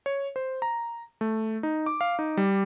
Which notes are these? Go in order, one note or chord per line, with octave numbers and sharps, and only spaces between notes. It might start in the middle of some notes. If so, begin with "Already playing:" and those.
C#5
C5
A#5
A3
D#4
D6
F5
D#4
G3